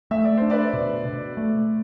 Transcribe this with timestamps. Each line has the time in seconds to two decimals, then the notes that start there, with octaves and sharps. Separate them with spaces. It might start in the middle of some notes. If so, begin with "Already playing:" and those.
0.11 A3 E5
0.24 D5
0.37 D4 C5
0.50 B4 D5
0.73 B2
1.05 B2
1.37 A3